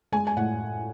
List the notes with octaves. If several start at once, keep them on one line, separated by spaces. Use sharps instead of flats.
G#3 G#5
G#5
A2 F#5